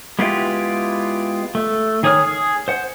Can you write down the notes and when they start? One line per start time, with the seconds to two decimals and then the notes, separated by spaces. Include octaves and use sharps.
0.19 G#3 B3 E4 F4 G4
1.55 A3
2.03 D#3 G#4 C#5 D#6 F6
2.23 G#4
2.68 C5 F#5